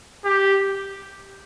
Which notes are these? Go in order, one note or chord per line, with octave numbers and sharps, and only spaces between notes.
G4